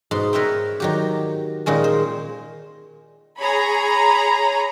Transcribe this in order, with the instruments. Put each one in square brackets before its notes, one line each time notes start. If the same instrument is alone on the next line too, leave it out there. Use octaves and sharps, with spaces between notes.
[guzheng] G#2 B2 C6
A#4 B4 C#5 E5 G5
D#3 F#3 G4
A#2 D#3 G#3 C#4
C5
[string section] G#4 C#5 A#5 B5